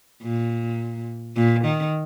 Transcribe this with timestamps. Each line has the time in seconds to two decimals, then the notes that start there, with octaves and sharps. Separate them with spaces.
0.22 A#2
1.36 A#2
1.65 D#3